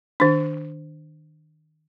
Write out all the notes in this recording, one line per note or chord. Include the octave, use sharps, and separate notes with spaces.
D#3 D4